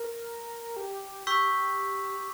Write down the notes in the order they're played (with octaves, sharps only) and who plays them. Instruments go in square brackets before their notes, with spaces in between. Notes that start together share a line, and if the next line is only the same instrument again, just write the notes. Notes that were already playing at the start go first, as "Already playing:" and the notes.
Already playing: [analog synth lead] A#4
G4
[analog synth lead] G4 [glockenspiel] C#6 E6 G6 B6